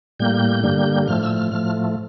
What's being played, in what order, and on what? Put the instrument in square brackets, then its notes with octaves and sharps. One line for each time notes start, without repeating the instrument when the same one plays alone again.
[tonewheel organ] A2 G3 A#3 G6
G2 D3 G3 A#3
A2 F3 A3 F6
E6
F6
A2 F3 A3 F6